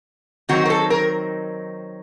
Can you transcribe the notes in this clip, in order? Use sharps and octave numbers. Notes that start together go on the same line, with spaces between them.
D#3 F#3 C4 D#4 F#4
A#4
A4
A#4